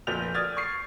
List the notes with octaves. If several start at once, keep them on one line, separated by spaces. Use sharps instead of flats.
F1 A#2 B4 G6 F7
D5 D#6 F6 G#6 A6
C#6 C7